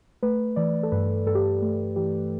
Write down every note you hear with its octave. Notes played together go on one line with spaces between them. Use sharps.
A3 B4
E3 D5
A4
G2 B4
G2 A4
G4
A4
A3
E3 G4